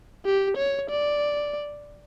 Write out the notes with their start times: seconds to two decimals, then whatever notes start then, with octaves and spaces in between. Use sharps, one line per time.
0.26 G4
0.57 C#5
0.90 D5